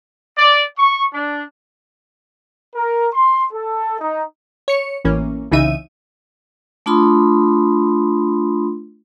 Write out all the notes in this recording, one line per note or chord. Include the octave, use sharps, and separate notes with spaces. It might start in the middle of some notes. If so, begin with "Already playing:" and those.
D5
C#6
D4
A#4
C6
A4
D#4
C#5 C#7
A1 E3 A#3 C#4
C2 C#3 E3 D#4 E5 D#7
A3 D4 F4 B5 C6 D#6